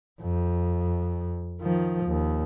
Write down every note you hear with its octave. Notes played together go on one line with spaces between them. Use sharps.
F2
D#3 F3
D#2